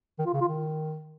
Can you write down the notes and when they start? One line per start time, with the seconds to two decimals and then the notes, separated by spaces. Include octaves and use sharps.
0.18 D#3
0.26 F4
0.33 C#3
0.41 F4
0.48 D#3